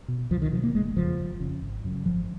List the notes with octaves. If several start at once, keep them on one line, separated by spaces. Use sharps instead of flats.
B2
C#2 F3
D#3
B2 F3
A#3
F#1 G#3
F2 C#3 F3
F#1
F2 C#3
G#1
F#2 C#3
G#1 F3